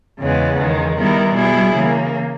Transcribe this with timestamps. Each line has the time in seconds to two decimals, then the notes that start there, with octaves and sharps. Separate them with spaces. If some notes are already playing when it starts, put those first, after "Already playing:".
0.19 E2 C#3 E3 G#3 B3
0.58 E2 D#3 G#3
0.97 D#3 G3 B3 E4 A#4
1.35 B2 G3 B3 E4 G#4
1.74 C#3 E3 A#3